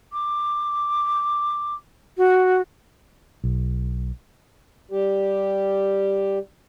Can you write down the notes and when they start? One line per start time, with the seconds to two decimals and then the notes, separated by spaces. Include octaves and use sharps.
0.12 D6
2.17 F#4
3.44 B1
4.91 G3 G4